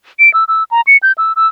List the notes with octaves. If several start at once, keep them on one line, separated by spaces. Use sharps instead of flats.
D7
E6
E6
A#5
C#7
G6
E6
E6